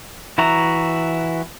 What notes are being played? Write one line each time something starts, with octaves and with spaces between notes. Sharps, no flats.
E3 E4 F#4 A#5